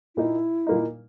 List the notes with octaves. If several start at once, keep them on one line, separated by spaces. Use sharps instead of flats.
A#2 A#3 D#4 E4
A#2 A#3 D#4